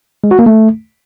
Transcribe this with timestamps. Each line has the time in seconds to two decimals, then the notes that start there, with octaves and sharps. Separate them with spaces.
0.24 G#3
0.31 F#4
0.39 A#3
0.46 A3